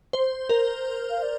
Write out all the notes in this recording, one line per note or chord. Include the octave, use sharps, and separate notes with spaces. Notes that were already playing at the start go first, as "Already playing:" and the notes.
C5
A#4
F5
D5